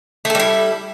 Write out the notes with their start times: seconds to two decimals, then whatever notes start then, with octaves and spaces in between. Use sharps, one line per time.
0.25 A3
0.30 A4
0.35 G3
0.40 E4